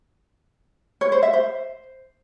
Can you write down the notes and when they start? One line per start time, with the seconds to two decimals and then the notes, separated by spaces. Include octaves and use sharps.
1.01 C#5
1.12 C5
1.23 E5
1.33 C5